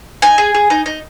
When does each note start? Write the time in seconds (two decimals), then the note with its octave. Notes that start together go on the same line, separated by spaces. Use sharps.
0.22 D#4 G#5
0.38 G#4
0.54 G#4
0.70 D#4
0.86 D#4